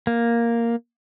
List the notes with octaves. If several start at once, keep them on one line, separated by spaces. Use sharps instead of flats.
A#3